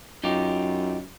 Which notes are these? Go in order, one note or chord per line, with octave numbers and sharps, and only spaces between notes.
F#2 D#4 F4 G4